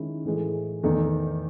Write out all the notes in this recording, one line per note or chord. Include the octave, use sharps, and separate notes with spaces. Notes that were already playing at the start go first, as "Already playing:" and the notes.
Already playing: D#3 G#3 C#4 E4
A2 E3 G#3
E2 D#3 A3 D#4